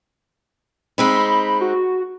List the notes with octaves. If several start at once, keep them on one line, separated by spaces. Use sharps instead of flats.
G#3 C4 D#4 B5
F#4